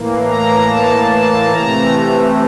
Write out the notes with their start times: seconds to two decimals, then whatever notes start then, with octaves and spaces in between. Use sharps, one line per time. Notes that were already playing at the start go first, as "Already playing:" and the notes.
Already playing: A2 E3 A#3
0.28 A#5
0.69 A5
1.11 A5
1.52 C3 E3 A3 A#5